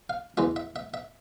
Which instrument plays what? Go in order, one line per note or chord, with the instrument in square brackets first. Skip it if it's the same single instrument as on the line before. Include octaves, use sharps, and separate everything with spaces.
[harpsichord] F5
E2 E3 G#3 E5
E5
E5
E5